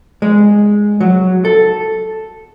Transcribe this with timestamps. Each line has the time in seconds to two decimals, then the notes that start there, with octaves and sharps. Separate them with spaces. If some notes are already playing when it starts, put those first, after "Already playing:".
0.22 G#3
1.00 F#3
1.45 A4